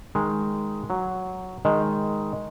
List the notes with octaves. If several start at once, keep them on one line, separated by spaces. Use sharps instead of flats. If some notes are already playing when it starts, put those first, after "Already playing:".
D#3 G#3
F#3
D#3 G#3